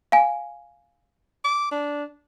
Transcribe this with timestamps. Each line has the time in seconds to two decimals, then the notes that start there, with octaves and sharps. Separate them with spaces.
0.12 F5 G#5
1.45 D6
1.71 D4